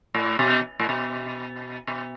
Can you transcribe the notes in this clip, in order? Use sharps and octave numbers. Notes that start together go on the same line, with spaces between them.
A2
B2
A2
B2
B2